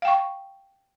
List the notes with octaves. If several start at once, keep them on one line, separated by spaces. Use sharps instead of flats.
F5 G5 C#6